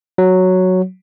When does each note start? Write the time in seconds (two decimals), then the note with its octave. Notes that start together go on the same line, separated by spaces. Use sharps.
0.18 F#3